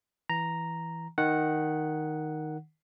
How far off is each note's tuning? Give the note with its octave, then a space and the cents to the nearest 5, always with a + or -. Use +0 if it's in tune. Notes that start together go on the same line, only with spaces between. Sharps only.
E3 +0 A#5 +0
D#3 +0 F#5 +0